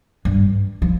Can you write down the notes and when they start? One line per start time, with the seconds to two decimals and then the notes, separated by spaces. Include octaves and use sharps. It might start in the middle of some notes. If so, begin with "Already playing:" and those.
0.25 G2
0.82 F3